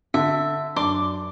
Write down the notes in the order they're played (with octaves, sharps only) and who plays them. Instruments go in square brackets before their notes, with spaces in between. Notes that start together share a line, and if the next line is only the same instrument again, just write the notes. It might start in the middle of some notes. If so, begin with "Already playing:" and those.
[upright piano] D3 [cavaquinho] E5
[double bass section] F#2 [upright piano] D4 [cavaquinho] C6 D6